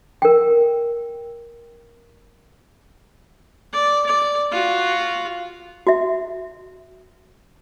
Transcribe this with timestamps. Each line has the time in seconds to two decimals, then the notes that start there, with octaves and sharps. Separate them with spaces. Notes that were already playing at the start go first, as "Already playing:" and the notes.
0.22 A#4 G5
3.73 D5
4.06 D5
4.52 F4 F#4
5.87 F#4 E5